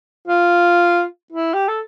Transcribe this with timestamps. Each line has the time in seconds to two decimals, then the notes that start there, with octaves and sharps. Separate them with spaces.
0.28 F4
1.32 E4
1.54 G4
1.68 A4